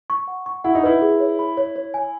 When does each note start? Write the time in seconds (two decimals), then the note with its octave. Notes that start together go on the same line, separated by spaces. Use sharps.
0.10 C#6
0.28 F#5
0.46 C#6
0.64 E4 F#5
0.75 D#4
0.84 E4 B4
1.02 G#4
1.20 C#5
1.39 B5
1.57 C#5
1.76 C#5
1.94 G#5